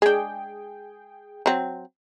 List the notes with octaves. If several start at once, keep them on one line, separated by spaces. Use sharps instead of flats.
G#3 D4 G#4 G5
F#3 C4